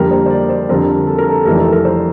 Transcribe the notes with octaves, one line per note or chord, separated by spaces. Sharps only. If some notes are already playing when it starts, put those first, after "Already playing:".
Already playing: F2 D3 G3 A#3 A#4
C5
C5
D5
C5
F2 D3 G3 C4 A#4
A4
A#4
A4
F1 F2 E3 G3 A#4
A4
A#4
C5